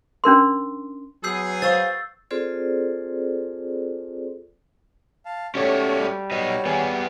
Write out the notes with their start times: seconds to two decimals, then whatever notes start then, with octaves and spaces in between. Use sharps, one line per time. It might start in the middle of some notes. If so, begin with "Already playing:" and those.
0.24 C#4 D4 A#4 C6
1.24 F#3 B3 G#4 E6 G6 C7
1.62 C5 F5 C#6 E6 A6
2.31 C4 F4 G#4 A4 C5 D5
5.25 F5 A5
5.55 A3 C#4 F#4 G4 C#5 D5
6.00 G3
6.31 B3 D#4 F#4 C#5
6.66 B3 G#4